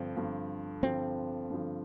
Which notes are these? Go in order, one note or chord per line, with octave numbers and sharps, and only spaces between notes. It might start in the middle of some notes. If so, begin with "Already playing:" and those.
Already playing: G2 D3 F3 C4
G2 D3 F3
G2 D3 F3 C4
G2 D3 F3